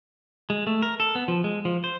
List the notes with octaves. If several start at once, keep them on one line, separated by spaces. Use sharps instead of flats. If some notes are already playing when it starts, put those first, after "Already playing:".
G#3
A3
A#4
A4
B3
F3
G#3
F3
C5